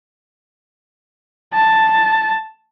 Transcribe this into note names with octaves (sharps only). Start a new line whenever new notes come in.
A5